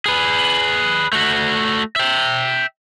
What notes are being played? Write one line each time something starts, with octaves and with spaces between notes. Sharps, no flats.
G#4 B4
A3 F#4
E5 G5